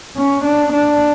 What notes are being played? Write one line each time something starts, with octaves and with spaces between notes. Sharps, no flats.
C#4
D4
D4